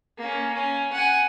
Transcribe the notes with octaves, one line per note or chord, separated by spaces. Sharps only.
A#3 C#4
C#4
F#5 G#5